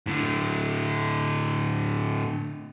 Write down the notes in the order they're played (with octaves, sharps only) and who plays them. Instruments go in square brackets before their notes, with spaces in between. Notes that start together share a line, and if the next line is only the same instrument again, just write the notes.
[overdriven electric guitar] A2 D3